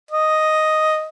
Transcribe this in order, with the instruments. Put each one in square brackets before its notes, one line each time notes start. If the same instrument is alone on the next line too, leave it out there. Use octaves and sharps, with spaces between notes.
[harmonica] D#5